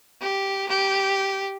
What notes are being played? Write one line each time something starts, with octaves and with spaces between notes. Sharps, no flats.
G4
G4